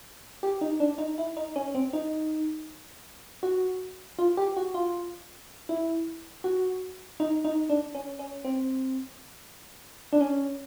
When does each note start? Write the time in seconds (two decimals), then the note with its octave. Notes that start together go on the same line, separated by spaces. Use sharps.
0.43 G4
0.61 D#4
0.80 D4
0.98 D#4
1.18 E4
1.37 D#4
1.56 C#4
1.75 C4
1.93 D#4
3.43 F#4
4.19 F4
4.37 G4
4.57 F#4
4.74 F4
5.69 E4
6.44 F#4
7.20 D#4
7.45 D#4
7.70 D4
7.95 C#4
8.19 C#4
8.45 C4
10.13 D4
10.21 C#4